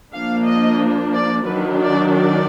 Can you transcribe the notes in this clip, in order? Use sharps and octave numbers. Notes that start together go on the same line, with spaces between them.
F3 A#3 D4 F5
D#5
D5
D#3 F#3 D4 B4
D5
D5